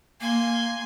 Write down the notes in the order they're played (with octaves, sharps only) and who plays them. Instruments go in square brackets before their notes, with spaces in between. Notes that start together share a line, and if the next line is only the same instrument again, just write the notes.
[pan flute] A#3 [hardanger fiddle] G#5 C6